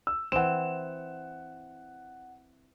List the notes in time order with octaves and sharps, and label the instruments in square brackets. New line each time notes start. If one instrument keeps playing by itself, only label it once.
[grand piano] E6
[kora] E3 C4 [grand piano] F#5 E7